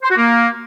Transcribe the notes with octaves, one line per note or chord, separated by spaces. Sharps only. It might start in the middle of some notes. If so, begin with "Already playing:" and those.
C5
F#4
A#3